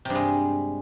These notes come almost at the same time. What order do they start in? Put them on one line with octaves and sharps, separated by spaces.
C3 G2 G#3